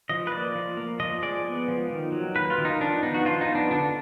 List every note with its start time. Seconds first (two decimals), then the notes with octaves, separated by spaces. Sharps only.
0.09 F3 D#5
0.27 B4
0.31 A#3 D5
0.55 F3
0.77 A#3
1.00 F3 D#5
1.22 G#3 D5
1.45 B3
1.68 F3
1.90 D#3
2.12 F#3
2.36 A#3 B4
2.50 F4
2.58 D#3
2.65 D#4
2.81 F3 D4
3.03 B3 D#4
3.14 F#4
3.25 F3 F4
3.41 D#4
3.48 B3
3.55 D4
3.71 D3 D4